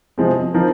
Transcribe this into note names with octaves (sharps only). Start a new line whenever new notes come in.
C3 F3 G#3 C4
F3 C4 D#4 A#4